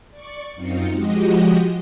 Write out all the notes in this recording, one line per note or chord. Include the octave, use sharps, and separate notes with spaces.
D5 C#6
F#2 C4 D#4 F4 C#7
F3 G#3 F#4 G4 D#5